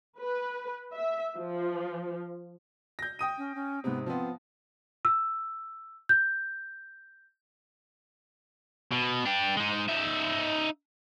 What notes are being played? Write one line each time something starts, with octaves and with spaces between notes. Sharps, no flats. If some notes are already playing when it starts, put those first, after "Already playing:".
B4
E5
F3
G6 A#6
G5 D#6 D#7
C#4
C#4
G#2 C3 B3
F3 B3 C4
E6
G6
B2
D4 G4
G#3 D#4
D#4 E5